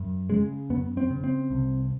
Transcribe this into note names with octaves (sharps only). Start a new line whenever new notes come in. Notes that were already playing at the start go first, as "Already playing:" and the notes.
Already playing: F#2
C#3 G#3
F#2 B3
C4
C#3
C4
C2